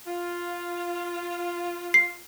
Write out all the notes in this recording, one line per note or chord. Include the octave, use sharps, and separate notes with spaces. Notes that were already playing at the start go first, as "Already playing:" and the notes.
F4
C7